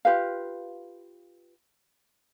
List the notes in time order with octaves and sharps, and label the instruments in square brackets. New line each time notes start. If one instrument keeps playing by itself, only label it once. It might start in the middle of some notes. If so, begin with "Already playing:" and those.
[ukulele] F4 G4 B4 F5